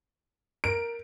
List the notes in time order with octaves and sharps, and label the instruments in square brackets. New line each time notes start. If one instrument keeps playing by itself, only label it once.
[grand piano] A#4 [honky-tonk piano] D7